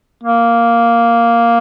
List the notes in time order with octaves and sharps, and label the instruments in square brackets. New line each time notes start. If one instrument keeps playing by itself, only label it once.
[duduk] A#3